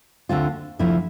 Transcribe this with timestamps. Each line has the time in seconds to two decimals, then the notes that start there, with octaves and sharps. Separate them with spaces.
0.29 D2 D3 A3 C4 F4
0.79 D2 C3 F3 A3 E4